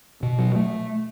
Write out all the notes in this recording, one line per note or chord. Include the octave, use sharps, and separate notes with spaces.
B2
F#3
A3